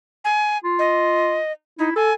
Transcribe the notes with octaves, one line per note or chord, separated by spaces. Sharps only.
G#5
F4
D#5
D#4 E4
A4 G#5